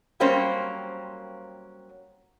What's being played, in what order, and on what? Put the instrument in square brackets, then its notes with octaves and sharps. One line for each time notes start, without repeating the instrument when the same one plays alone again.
[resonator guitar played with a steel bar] F#3 G3 A#3 C4 C#4 C5